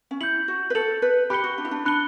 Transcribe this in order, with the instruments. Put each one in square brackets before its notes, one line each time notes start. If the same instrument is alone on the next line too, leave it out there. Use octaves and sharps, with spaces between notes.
[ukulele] C#4
[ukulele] E4 [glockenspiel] G6 C#7 F#7
[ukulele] F#4
B4
[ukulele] A4 [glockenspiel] G6 C#7 F#7
[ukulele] B4
[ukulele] G4 [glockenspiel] B5 F#6 C#7 G7
[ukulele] F#4
D4
E4
D4
[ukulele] D4 [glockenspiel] B5 F#6 C#7 G7